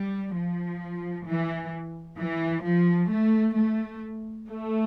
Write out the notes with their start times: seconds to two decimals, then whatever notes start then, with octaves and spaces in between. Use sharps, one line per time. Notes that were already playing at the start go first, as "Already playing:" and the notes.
Already playing: G3
0.34 F3
1.27 E3
2.18 E3
2.64 F3
3.11 A3
3.57 A3
4.50 A3